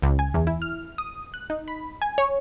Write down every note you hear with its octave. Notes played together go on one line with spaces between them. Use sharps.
C#2
G#5
E2
E4
F6
D#6
F#6
D#4
B5
G#5
C#5